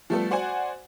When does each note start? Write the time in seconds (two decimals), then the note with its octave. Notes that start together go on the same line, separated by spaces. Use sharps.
0.10 F3 G3 A3 B3 A4
0.31 F#4 C5 D5 F#5 G#5